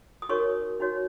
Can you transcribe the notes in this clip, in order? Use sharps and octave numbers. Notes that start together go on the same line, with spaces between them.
D#6
D#4 F#4 A#4 C#5 C#6
D#4 F#4 C#5